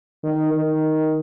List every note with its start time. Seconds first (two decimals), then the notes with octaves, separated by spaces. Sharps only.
0.24 D#3
0.53 D#3